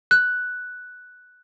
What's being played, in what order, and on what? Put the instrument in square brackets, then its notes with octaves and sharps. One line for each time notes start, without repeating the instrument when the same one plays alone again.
[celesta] F#6